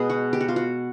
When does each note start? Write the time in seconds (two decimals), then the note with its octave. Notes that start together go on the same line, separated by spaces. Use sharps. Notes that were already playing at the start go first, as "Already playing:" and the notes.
Already playing: B2 G#3 B3 G#4
0.10 F#4
0.33 G4
0.40 F#4
0.48 F4
0.56 F#4